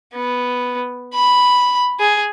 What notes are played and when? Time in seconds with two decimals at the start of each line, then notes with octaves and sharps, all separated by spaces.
0.14 B3
1.14 B5
2.00 G#4